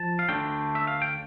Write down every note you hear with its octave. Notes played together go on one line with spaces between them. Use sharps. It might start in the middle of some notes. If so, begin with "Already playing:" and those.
Already playing: F3 A5
F5
D2 D3 A3 D4 G5
E5
F5
G5